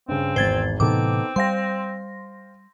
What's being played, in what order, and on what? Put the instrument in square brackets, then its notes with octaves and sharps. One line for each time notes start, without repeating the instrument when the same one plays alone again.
[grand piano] G2 C#3 [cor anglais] C4
[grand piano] G#1 E2 [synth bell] C5 G#6 A6
[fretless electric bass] A2 C3 E3 [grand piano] B3 D#4 A4 [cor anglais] C4 [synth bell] D6
[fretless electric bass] G3 [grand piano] C5 F5 G5 [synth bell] C6 A#6